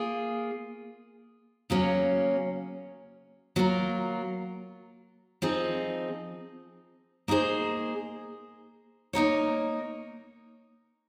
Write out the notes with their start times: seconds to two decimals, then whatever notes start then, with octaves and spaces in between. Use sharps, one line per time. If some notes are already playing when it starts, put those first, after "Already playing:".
Already playing: A#3 F4 G#4
1.70 C#3 F#3 A#3 C#4
3.56 F#3 A#3 F4 A#4
5.42 F3 C4 D#4 G#4
7.28 A#3 D#4 G#4 C5
9.13 A#3 D#4 A#4 C#5